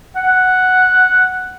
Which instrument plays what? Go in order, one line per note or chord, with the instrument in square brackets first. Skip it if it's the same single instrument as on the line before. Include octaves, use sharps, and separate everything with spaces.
[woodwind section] F#5